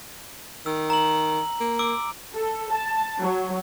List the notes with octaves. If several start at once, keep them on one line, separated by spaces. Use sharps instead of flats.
D#3 E6
A#5 F#7
A#3
D6 E6 D7
A4
A5
F#3